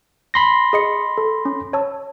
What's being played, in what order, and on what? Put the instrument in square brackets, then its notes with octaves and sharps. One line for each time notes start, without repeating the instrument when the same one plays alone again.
[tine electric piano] B5 C6 A#6
[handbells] G#4 D#5 C#7
A4
C#4
C#5 A5 E6